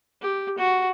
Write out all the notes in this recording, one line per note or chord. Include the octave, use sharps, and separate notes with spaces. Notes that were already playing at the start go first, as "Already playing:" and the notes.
G4
F#4